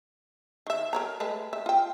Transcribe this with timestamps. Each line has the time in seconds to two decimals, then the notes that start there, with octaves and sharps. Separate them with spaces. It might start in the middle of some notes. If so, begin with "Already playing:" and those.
0.67 D#3 E5
0.93 A#4 C#5 A#5
1.20 G#3 A3 B4
1.53 E5
1.66 F4 G5